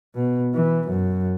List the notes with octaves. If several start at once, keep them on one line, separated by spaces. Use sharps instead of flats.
B2
E3
F#2